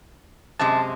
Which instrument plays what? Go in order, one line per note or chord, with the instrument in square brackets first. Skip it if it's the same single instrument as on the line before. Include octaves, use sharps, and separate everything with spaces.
[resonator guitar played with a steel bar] F#2 C3 G#3 [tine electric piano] A5